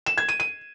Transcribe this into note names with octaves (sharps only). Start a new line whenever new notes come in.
E7
G#6
D#7
D#7